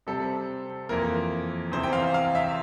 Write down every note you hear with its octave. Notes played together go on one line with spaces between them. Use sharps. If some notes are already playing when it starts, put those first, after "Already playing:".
C3 G3 C4 A4
F2 E3 A#3 A#4
E2 C3 E3 C5
G5
F5
F5
E5